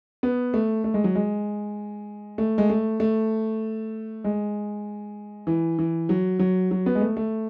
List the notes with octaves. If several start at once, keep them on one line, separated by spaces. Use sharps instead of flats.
B3
A3
A3
G#3
F#3
G#3
A3
G#3
A3
A3
G#3
E3
E3
F#3
F#3
F#3
B3
G#3
A3
A3